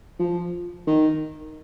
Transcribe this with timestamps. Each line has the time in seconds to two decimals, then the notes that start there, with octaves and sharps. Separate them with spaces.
0.20 F3
0.87 D#3